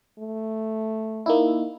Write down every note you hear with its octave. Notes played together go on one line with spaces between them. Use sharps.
A3
A#3 D#4 E4